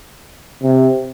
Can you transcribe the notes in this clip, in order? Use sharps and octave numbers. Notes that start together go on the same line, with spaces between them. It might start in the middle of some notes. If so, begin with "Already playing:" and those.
C3